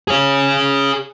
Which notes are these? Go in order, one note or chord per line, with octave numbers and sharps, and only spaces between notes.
G#4 C#5